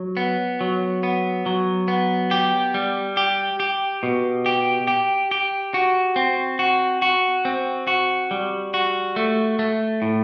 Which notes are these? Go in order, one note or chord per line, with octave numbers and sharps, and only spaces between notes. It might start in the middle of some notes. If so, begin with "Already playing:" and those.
Already playing: F#3
B3
F#3
B3
F#3
B3
G4
G3
G4
G4
B2
G4
G4
G4
F#4
C4
F#4
F#4
C4
F#4
G3
F#4
A3
A3
A2